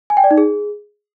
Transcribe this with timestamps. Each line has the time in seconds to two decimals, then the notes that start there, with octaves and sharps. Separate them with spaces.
0.10 G#5
0.17 G5
0.24 D5
0.31 D#4
0.38 G#4